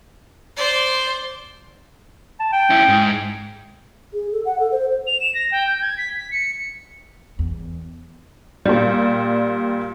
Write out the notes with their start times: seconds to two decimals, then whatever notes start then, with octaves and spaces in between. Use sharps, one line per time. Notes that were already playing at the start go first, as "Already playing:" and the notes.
0.57 C5 D5
2.40 A5
2.53 G5
2.70 C#4 E4
2.89 G#2
4.13 G#4
4.32 A4
4.45 F#5
4.59 A4
4.72 C5
5.07 F7
5.20 E7
5.35 A#6
5.51 G5
5.67 G6
5.82 G#6
5.98 B6
6.17 B6
6.31 C#7
7.39 E2
8.66 A#2 G3